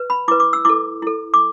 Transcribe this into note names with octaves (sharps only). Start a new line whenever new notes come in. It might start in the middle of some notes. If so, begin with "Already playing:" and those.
Already playing: B4
B5
E4 B4 D6
D6
E6
E4 A4 D6
E4 A4
D6